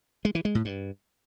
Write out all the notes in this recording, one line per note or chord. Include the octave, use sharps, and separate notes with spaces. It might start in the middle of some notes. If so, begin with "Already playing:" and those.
G#3
E3
G#3
A2
G2